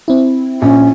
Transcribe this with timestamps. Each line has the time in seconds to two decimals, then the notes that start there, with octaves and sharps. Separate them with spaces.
0.08 C4 E4
0.62 A#1 C#4